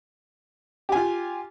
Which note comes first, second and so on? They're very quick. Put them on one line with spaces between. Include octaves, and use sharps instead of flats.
G4 G#5 F4